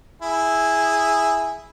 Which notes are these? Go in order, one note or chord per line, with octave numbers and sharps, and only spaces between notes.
E4 G#4